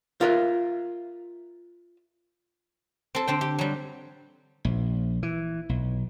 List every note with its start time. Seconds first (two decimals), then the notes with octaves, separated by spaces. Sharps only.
0.21 F4 A#4 E5
3.15 C4 A4
3.27 D3 C4 G5
3.41 G4
3.59 F#3 G3
4.65 A#1
5.23 E3
5.69 B1